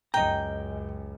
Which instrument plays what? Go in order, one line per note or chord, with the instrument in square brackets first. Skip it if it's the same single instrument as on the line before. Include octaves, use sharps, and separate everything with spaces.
[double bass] C#2 F#2 [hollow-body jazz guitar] D#5 A#5 [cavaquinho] G5